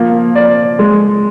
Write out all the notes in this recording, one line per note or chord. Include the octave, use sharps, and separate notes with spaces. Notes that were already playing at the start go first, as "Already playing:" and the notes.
Already playing: F3 A#3
D5
G#3